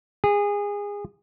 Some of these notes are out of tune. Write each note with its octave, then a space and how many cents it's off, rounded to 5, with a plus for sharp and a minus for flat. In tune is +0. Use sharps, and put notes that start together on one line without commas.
G#4 -25